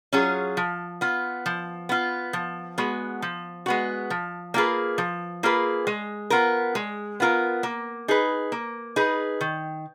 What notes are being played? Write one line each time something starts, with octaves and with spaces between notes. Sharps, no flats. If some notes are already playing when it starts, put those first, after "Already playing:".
F#3 C#4 F4 G#4
F3
B3 F4
F3
B3 F4
F3
G#3 B3 F#4
F3
G#3 B3 F#4
F3
A#3 F4 G#4 B4
F3
A#3 F4 G#4 B4
G#3
B3 F4 A#4
G#3
B3 F4 A#4
A#3
D#4 G#4 B4
A#3
D#4 G#4 B4
D#3